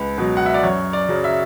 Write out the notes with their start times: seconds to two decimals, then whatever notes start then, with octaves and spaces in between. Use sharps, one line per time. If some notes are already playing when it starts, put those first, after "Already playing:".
Already playing: C#2 B4
0.18 B2 F#3
0.37 F#5
0.46 E5
0.54 D5
0.63 F#2 C#5
0.93 D5
1.09 C#3 F#3
1.24 E5